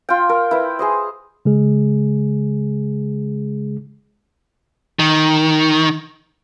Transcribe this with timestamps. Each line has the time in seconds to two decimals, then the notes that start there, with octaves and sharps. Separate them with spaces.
0.09 F4 G5
0.29 A#4
0.51 E4 B4
0.79 G#4 C5 D#5
1.45 C#3 G#3 G#4
4.99 D#3